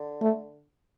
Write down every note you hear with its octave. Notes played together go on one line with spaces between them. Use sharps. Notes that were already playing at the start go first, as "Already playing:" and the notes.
Already playing: D3
A3